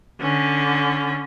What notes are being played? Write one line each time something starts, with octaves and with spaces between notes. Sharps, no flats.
D3 C#4